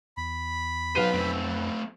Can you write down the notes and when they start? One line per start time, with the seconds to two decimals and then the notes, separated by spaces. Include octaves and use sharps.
0.17 E2 B5
0.95 B1 B4 C5 F5 D#7
1.13 F2 A3 C4